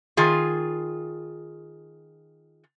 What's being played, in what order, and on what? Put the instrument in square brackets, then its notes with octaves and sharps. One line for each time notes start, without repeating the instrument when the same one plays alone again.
[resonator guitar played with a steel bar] D#3 F4 G#4